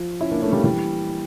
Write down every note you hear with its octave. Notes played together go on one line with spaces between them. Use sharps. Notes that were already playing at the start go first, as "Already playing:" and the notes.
Already playing: F3
C#4 E4
A#3 D4
A3 C#4
G3 A#3
E3 G3